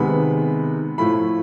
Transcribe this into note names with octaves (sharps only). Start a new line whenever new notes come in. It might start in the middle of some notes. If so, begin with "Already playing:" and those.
Already playing: C3 D#3 G#3 B3 B5
A2 F3 A3 B5